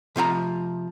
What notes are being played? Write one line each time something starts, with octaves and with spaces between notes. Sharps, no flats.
C3 F3 E5 A#5